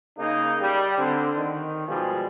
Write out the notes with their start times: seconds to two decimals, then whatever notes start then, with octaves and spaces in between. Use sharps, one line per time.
0.19 C#3 A#3 D#4
0.61 G3
0.98 D3 C4
1.36 D#3
1.87 B2 F3 G3 G#3